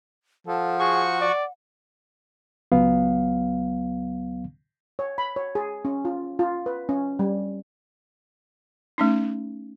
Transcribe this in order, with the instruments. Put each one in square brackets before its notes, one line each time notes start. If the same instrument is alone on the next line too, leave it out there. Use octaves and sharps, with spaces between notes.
[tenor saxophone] F3 [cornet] A4 [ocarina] F#5
[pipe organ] F#4 C#6 [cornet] G#4
[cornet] D5
[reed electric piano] C#2 F#3 B3 F5
[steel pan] C#5
B5
C#5
G#4
C#4
F4
F4
B4
C#4
G3
[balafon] A3 C#4 D#4